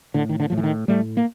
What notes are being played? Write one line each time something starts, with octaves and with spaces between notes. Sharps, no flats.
A2 D3
D#3
D3
A2 F3
E3
D#3
A2 G3 A3
A#3